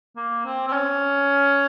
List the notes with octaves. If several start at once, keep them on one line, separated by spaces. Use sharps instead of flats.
A#3
C4
C4
C#4